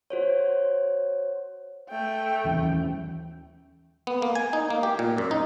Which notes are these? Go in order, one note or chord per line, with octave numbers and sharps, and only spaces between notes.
F#4 C5 C#5
A3 G5
D#2 E3 C#4
B3
A#3
G#5
D#4
A#3
G4
A#2
F#2
D#4